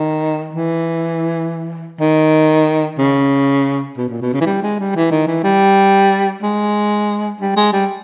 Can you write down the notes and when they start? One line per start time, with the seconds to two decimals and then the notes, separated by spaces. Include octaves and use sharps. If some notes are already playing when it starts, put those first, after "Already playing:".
Already playing: D#3
0.53 E3
2.00 D#3
2.98 C#3
3.97 B2
4.09 A#2
4.22 B2
4.33 C#3
4.41 E3
4.46 G3
4.63 G#3
4.79 G3
4.96 E3
5.11 D#3
5.27 E3
5.43 G3
6.42 G#3
7.40 G3
7.56 G#3
7.73 G3